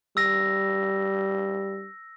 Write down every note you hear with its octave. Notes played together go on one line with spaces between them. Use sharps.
G3 E6 A#6